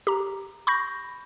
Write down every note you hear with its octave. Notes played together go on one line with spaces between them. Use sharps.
G4 A#5
B5 C#6 G6 A#6